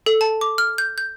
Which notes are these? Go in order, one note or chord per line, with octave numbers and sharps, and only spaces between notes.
A4
A5
D6
F6
G6
G6